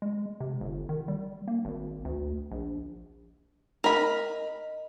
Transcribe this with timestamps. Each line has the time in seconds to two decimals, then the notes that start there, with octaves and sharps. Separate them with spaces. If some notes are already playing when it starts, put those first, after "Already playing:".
0.02 G#3
0.40 C3
0.61 G1
0.89 D#3
1.08 G3
1.48 A#3
1.65 G#1
2.05 D2
2.51 A#1
3.84 A#4 D#5 B5